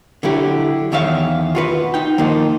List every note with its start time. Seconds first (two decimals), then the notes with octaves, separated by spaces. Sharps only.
0.23 D3 F#3 E4 G4
0.92 E2 D#3 C#5 E5 F5
1.55 F4 F#4 B4
1.94 D#4 G5
2.18 D#3 F3 A#3 D#4